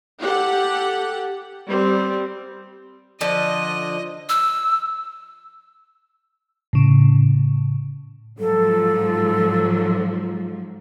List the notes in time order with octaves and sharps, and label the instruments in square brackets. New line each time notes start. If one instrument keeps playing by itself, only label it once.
[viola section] G4 A4 F#5
G3 C4
[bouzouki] D3 F3 D4 [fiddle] D#5
[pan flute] E6
[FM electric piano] A2 C#3
[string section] G#2 F3 F#3 [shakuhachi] A4